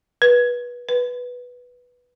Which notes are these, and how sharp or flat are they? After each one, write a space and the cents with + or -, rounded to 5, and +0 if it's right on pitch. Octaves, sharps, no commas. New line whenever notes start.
B4 -25
B4 -5